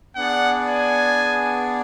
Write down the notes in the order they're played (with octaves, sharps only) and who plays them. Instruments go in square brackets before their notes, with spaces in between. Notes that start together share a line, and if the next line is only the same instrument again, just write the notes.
[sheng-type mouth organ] B3 D4 G#4 D5 [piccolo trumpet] F#5
[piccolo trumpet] G#5